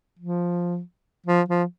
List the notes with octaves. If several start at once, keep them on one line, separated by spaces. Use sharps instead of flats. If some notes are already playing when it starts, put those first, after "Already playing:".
F3
F3
F3